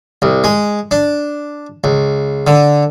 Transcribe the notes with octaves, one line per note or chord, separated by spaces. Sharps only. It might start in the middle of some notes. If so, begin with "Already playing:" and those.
C2
G#3
D4
C#2
D3